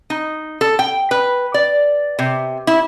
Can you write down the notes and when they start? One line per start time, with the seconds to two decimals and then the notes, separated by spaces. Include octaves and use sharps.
0.10 D#4
0.61 A4
0.79 G5
1.11 B4
1.54 D5
2.19 C3
2.67 E4